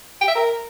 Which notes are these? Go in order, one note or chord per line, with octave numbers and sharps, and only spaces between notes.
G5
E5
A#4